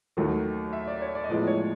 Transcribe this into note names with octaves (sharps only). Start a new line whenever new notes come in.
D#2 D#3 F#3 A3
E5
D5
C#5
D5
D#5
A2 F3 G#3 B3 D5
C#5